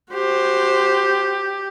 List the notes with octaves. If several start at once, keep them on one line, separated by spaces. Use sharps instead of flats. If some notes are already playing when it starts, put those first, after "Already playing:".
F#4 G4 C5